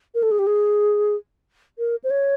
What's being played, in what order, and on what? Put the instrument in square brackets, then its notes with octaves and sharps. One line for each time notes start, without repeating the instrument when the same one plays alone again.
[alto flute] A#4
A4
G#4
G4
G#4
A#4
C5
C#5